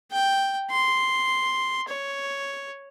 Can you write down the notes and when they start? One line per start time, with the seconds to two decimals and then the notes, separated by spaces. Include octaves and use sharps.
0.12 G5
0.71 C6
1.89 C#5